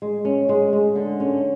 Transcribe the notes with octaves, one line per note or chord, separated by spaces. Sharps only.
G#3
C#4
G#3
G#3
D3
C#4